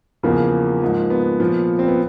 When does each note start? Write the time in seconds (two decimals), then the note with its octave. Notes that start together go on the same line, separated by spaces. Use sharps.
0.23 E2 C#3 F3 A#3
0.82 G#2 F3
1.10 B3
1.40 A#2 F3
1.79 C4
1.88 B3